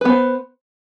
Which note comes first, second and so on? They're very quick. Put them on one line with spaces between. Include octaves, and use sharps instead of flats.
B4 B3 C5